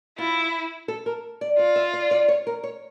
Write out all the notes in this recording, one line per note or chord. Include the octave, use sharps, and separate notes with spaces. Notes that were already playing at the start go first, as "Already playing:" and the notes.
E4 F4
A4
A#4
D5
F4 D5
E5
D5
D5
C#5
A#4
C#5